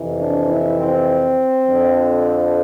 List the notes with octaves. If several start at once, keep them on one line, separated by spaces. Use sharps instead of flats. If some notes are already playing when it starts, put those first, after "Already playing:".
Already playing: F2 C3 E3
D4
E4
C4
F2 D3 F3